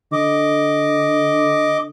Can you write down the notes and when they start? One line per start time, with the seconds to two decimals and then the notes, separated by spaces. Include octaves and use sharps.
0.12 D3 D#5 D6